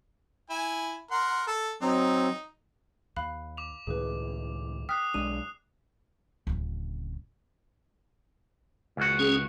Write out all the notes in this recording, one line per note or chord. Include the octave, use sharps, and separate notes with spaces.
E4 G#5
A#4 F#5 C6
A4
F#3 C4 D#4
D#2 F5 B5 F#6
D6 F7
C#2 A2 D#3 G#4 B4
G5 D#6 F6 F#6 B6 C7
B1 G#3 D4 D#7
D1 C#3
C#2 F#4
C#4 G#4